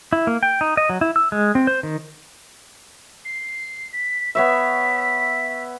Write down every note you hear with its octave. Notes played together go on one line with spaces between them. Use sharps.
E4
A#3
G5
D#4
D#5
F#3
E4
E6
G#3
C4
C5
D#3
C7
B6
B3 C#5 E5 B6